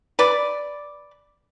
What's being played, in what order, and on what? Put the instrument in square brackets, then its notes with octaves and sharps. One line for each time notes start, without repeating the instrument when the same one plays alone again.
[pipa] B4 D5